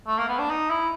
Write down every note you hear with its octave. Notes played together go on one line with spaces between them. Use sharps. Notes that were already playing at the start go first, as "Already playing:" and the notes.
A3
A#3
B3
D4
D#4
E4